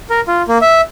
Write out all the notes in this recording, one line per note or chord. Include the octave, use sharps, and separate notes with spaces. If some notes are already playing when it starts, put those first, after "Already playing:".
A#4
F4
A#3
E5